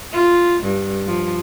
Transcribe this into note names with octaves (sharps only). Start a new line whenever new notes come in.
F4
G2
F3